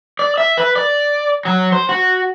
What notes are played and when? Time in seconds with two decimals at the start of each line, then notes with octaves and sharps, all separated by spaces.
0.19 D5
0.38 E5
0.57 B4
0.76 D5
1.45 F#3
1.72 C5
1.89 F#4